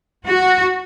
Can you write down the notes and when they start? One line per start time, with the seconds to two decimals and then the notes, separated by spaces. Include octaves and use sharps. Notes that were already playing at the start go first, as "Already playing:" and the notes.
0.26 F#4